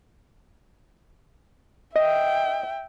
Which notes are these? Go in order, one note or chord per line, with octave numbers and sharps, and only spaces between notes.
D#5 E5 G5